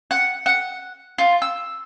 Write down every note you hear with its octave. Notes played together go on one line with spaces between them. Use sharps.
F#5
F#5
F4
E6